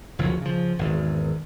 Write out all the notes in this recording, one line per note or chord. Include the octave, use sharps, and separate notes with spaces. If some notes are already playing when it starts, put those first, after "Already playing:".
F#1 D2 F3 F#3
C#3 F3
G#1 E2